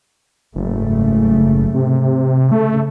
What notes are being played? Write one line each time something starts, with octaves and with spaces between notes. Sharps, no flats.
F#1 G#2 C#3 A3
C3
C#3 A3